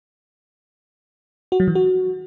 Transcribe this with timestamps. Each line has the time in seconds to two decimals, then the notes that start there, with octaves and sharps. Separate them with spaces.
1.52 F#4
1.60 F#3
1.68 E3
1.75 F#4